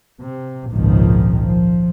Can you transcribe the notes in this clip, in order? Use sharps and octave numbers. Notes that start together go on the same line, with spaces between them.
C3
G#1 C#2 A#2 D#3 F3
F3